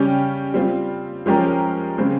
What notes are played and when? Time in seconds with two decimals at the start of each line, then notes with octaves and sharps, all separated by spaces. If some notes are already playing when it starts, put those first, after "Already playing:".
Already playing: C#3 G3 C#4 G4
0.54 G3 C4 F4
1.26 F3 G#3 C#4 G4 A#4
1.98 C#3 G#3 C4